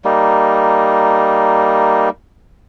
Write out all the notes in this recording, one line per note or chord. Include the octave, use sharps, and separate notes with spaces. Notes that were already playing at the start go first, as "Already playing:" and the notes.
G3 A#3 D#4